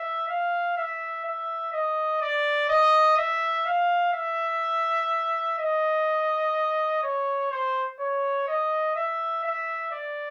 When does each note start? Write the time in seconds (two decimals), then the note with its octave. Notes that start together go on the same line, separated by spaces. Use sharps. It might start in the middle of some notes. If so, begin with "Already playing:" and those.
Already playing: E5
0.29 F5
0.77 E5
1.25 E5
1.73 D#5
2.22 D5
2.69 D#5
3.18 E5
3.66 F5
4.13 E5
5.59 D#5
7.03 C#5
7.51 C5
8.00 C#5
8.48 D#5
8.96 E5
9.44 E5
9.92 D5